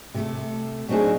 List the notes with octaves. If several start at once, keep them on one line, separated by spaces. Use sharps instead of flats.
C3 A3 A4
F#3 A3 C4 D4 D#4 G#4